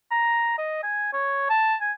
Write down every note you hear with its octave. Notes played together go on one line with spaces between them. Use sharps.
A#5
D#5
G#5
C#5
A5
G#5